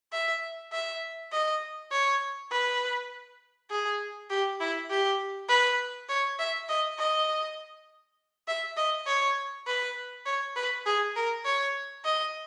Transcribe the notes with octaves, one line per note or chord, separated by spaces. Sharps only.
E5
E5
D#5
C#5
B4
G#4
G4
E4
G4
B4
C#5
E5
D#5
D#5
E5
D#5
C#5
B4
C#5
B4
G#4
A#4
C#5
D#5